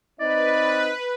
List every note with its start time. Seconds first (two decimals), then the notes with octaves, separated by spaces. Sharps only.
0.20 C4 D#4 B4 D5 D#5